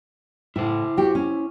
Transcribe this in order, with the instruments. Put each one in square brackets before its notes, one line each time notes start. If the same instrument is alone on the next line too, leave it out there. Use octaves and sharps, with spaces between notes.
[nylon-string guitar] A2 [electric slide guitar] E4 C5
[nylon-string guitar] F#4 G4
C#4